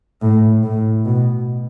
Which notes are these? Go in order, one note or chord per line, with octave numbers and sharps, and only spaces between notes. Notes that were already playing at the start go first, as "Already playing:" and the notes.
A2
A2
B2